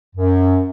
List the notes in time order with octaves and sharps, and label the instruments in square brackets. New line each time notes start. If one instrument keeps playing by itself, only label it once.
[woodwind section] F#2